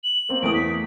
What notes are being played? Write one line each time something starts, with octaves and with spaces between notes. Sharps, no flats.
F#7
A#3 C4
E2 A3 D#6 D7
B6